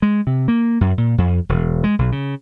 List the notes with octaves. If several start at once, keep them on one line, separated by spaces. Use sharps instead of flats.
G#3
C3
A#3
F#2
A#2
F2
E1
G#3
B1
C#3